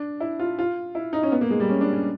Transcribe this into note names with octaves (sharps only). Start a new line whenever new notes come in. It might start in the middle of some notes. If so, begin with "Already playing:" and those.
Already playing: D4
E4
F4
F4
E4
D#4
C#4
B3
A#3
G#3
G3
C#4
D4
C#4